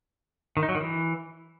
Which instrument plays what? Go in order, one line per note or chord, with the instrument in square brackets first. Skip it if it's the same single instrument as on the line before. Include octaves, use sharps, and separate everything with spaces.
[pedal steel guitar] D#3
D#4
F#3
D#3
E3